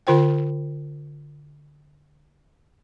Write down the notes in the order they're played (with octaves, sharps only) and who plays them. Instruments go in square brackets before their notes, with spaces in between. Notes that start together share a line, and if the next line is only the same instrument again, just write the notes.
[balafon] D3 F4 C5 G5